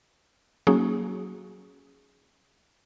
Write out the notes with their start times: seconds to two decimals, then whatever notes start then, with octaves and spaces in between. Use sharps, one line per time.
0.67 F#3 A#3 C#4 D#4 F#4 G#4